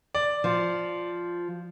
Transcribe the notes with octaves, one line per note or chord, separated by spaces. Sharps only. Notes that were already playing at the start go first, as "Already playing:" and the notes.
D5
F3